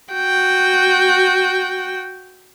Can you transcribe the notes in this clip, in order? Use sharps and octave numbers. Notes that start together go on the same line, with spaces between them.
F#4 G5